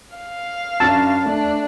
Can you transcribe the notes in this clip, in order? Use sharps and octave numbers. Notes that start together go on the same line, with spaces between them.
F5
F#2 D4 F#4 A5 E6 A6
A3 D4